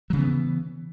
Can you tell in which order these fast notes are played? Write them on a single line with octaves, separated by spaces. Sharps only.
F#3 C#3 E3 B3